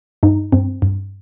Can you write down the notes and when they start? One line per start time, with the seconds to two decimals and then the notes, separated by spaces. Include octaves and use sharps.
0.23 G2 D#4
0.52 G2 C4
0.82 G2